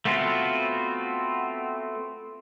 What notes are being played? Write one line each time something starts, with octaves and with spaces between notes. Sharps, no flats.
A3 B3 C4 F4 F#4